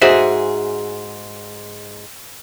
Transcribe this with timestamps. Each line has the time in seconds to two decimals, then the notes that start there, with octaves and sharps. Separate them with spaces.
0.02 G#2 F#4 G#4 C5 E5